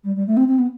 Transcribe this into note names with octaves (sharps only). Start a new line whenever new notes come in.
G3
G3
A3
C4
C4
B3